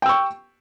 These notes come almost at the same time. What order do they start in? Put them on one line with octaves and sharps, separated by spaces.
G5 E6 C#6